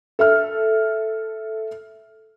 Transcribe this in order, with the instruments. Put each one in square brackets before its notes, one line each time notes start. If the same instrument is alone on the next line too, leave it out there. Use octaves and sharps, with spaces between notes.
[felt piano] A4 E5 F6